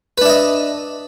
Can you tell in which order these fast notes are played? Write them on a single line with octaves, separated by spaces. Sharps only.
B4 D4 E5 D#5